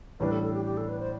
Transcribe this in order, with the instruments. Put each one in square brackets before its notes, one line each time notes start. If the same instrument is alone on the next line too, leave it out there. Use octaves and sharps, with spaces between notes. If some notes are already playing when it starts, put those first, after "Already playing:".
[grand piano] A1 A2 G3 D4 [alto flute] B4
[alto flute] A4
A4
G4
G4
A4
B4
C5